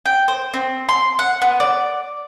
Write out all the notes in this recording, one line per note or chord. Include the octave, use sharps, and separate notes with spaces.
G5
C5
C4
C6
F#5
B3
D5